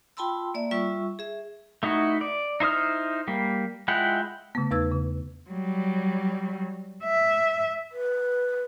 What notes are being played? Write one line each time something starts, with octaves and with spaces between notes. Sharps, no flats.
F4 G5 A5 B5 C6 E6
A#3 D5 E5
G3 F4 E5 C#6 E6
G#4 E5
A3 D#4 E4 F#4
D5
D#4 E4 C5 D#6 F6
G3 A#3
G#3 E4 F4 F#5 G5
C#3 A3 B3
E2 D#4 B4 E6 G#6
C#3
F#3 G3
E5
B4